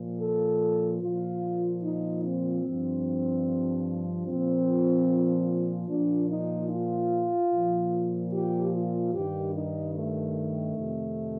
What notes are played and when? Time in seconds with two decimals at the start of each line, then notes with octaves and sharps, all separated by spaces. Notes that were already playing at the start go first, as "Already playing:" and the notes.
Already playing: A#2 F3
0.20 A4
1.01 A#2 F3 F4
1.83 D#4
2.23 C4
2.64 G2 F3
4.26 A#2 F3 C4
5.88 A#2 F3 D4
6.29 D#4
6.70 F4
7.51 A#2 F3
8.32 G4
8.73 F4
9.13 G2 D#3 G4
9.54 D#4
9.95 A3
10.76 F2 C3 D#3